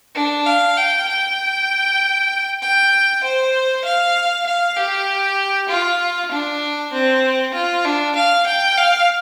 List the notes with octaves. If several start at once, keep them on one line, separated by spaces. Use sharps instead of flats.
D4
F5
G5
G5
G5
C5
F5
F5
G4
F4
D4
C4
F4
D4
F5
G5
F5